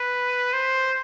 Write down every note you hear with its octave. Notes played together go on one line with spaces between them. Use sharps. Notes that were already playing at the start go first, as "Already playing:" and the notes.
Already playing: B4
C5